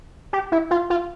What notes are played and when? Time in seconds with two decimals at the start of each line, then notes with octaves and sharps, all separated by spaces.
0.33 G4
0.52 E4
0.71 F4
0.90 F4